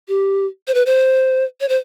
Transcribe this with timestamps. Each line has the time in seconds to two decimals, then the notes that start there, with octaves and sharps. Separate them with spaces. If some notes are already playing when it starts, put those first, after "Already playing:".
0.08 G4
0.68 C5
0.74 B4
0.86 C5
1.61 C#5
1.69 C5